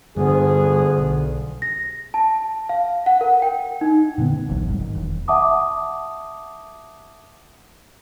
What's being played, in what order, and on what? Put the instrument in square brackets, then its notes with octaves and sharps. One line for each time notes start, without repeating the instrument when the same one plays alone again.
[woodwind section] D2 F3 B3 [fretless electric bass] G2 [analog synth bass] D3 [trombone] G#4
[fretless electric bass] B1
[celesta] A#6
A5
F5
F#5
A#4
G5
D#4
[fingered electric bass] A#2 D3 F3 B3
C3
D1 A1 D#2 F#3
G#1 G#2 G3
D#3
E1
[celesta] E5 F#5 A5 D6 D#6